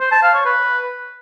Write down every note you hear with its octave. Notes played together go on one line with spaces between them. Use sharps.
C5
A5
F5
C#5
B4